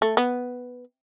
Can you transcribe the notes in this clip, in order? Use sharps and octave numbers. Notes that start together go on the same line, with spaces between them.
A3
B3